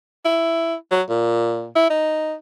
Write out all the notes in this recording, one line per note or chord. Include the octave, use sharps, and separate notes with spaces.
E4
F#3
A#2
E4
D#4